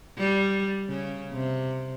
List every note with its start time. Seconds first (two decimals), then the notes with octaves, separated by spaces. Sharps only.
0.17 G3
0.89 C#3
1.32 C3